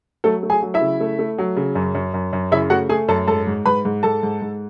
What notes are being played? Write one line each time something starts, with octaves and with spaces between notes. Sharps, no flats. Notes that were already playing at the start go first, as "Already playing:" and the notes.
F#3 A3 A4
A3
G#4 G#5
F#3
E4 E5
C#3
A3
A3
F#3
C#3
F#2
F#2
F#2
F#2
C#3 E4 E5
A3 F#4 F#5
A3 G#4 G#5
F#2 A4 A5
G#2 A4 A5
G#2
G#2 B4 B5
G#2
G#2 A4 A5
G#2
G#2